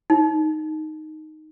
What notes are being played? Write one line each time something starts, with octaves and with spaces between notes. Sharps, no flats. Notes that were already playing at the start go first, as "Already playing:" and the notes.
D#4